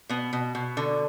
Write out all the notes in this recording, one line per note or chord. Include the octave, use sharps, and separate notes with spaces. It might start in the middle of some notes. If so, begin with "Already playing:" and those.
B2 B3
B2
B2
D3